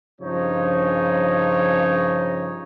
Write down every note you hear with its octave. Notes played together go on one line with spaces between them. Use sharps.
G2 C#3 F3 D#4 C#5